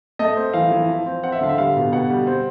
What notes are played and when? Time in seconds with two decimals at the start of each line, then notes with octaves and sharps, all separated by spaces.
0.19 A3 D#5
0.37 C4
0.54 E3 F5
0.71 E3
0.89 F3
1.06 C4
1.23 C4 F#5
1.32 E5
1.41 D3 F5
1.49 E5
1.58 G3 F5
1.76 B2
1.92 B2 F#5
2.10 G3
2.27 C4